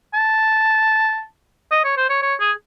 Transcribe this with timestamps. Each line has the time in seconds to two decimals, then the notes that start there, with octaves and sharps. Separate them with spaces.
0.14 A5
1.71 D#5
1.84 C#5
1.97 C5
2.10 C#5
2.22 C#5
2.40 G#4